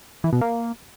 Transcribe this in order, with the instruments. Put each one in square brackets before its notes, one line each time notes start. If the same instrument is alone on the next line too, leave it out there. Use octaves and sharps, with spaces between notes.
[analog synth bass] E3
B2
A#3